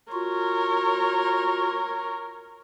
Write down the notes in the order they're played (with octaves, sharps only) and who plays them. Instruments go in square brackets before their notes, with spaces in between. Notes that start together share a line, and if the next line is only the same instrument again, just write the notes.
[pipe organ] F4 F#4 [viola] A#4 C#5